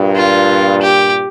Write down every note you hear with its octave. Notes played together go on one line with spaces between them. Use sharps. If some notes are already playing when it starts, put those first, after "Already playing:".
Already playing: G2 A#2
F4
G4